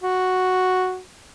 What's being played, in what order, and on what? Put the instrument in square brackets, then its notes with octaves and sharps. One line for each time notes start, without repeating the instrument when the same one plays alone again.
[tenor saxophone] F#4